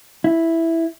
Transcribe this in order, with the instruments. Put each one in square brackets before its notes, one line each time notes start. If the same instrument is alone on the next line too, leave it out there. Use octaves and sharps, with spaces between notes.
[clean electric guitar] E4